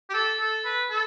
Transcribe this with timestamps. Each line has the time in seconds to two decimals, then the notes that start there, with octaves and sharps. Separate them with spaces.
0.10 G4
0.14 A4
0.40 A4
0.65 B4
0.90 A4